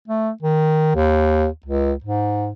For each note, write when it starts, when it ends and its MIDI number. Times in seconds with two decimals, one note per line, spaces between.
0.08 0.30 57
0.42 0.93 51
0.96 1.47 39
1.66 1.92 37
2.04 2.52 44